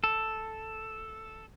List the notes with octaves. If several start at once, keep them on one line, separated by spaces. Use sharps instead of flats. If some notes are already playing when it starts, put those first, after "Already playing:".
A4